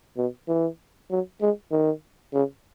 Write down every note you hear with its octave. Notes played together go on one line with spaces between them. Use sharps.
B2
E3
F#3
G#3
D#3
C#3